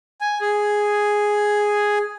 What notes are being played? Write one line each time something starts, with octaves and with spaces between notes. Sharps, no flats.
G#5
G#4